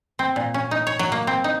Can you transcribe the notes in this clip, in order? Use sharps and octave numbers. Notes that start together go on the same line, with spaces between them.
C4
A#2
C#4
D#4
C#5
F#3
A#3
C4
D#4